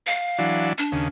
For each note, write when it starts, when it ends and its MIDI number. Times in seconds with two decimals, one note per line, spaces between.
0.07 0.67 77
0.39 0.73 52
0.39 0.73 54
0.39 0.73 62
0.78 1.07 62
0.92 1.08 39
0.92 1.08 49